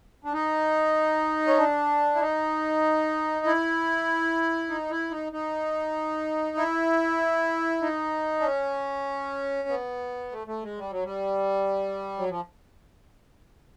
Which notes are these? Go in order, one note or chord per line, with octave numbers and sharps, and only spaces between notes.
D4
D#4
C#4
D4
E4
D#4
E4
D#4
E4
D#4
D#4
E4
D#4
D4
C#4
B3
A3
A3
G#3
G3
F#3
G3
F#3
F3